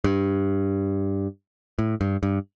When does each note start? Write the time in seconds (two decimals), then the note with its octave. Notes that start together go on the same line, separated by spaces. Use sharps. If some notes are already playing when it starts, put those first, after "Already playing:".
0.04 G2
1.79 A2
2.01 G2
2.23 G2